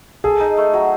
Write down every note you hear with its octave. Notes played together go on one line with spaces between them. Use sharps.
G#4 A4
D#4
A3
F#3